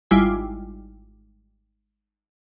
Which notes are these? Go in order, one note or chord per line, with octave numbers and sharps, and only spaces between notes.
G#1 G3 E4 F4 G#5